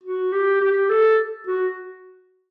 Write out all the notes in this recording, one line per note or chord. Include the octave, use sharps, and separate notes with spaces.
F#4
G4
G4
A4
F#4